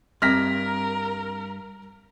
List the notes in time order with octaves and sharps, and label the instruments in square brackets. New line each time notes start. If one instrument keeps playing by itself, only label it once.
[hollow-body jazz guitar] G2 [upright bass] C4 [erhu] A#4 [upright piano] F6 A#6 B6